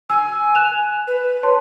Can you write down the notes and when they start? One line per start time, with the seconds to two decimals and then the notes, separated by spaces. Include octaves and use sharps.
0.10 G#5 E6
0.55 F#6 E7 F7
1.07 B4
1.43 C#5 A5 C6